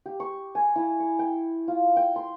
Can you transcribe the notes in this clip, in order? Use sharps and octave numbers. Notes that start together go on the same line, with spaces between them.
G4
C#6
G#5
E4
C#6
G5
F4
G5
C6